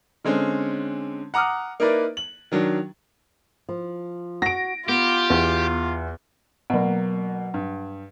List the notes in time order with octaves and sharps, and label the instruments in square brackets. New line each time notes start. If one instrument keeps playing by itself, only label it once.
[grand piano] D3 G#3 C4 C#4
F#5 A#5 D6 D#6 F6
A#3 D#4 E4 A#4 B4 D5
F#7
D#3 F#3 D4
[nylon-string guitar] F3
[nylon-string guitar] F#4 [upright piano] A#6 D7
[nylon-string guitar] B3 [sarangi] F4 [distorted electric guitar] G4
[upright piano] E2
[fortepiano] B2 A#3 [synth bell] F#3 F#5
[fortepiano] G2